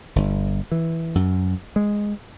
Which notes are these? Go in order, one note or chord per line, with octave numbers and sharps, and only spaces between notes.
G1
E3
F#2
G#3